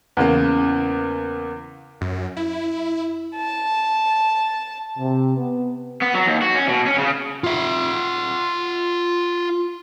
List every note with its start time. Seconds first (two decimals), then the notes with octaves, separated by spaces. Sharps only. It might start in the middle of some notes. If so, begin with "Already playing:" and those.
0.17 E2 C#3 A#3
2.01 F#2
2.37 E4
3.36 A5
4.98 C3
5.37 B3
6.02 B3
6.15 F#3
6.28 D#2
6.42 F#4
6.55 C#4
6.68 B2
6.86 C#4
6.98 C#3
7.44 F4 E5